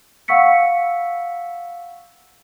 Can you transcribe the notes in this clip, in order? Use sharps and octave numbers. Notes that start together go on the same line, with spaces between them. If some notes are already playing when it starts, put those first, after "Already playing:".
F5 F#5 C#6 E6 B6 C#7